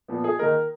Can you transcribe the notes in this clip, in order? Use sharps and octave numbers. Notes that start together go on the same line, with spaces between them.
A#2 F3 B3
G#4
D#3 A#3 D#4 A#4